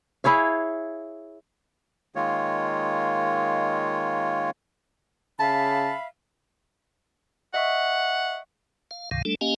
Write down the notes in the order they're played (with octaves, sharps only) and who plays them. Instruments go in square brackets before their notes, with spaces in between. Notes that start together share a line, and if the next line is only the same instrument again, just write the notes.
[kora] E4 G#4 C#5 F5
[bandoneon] D#3 G#3 A#3 F4 C#5
[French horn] C#3 [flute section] E5 F5 B5 [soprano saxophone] A5
[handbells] D#5 E5 C#6 [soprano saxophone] F#5
[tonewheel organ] F5
C#2 G2 C3 D#3 F5
G3 A3 D4 A4
A#3 C#4 G4 D#5 F5 G#5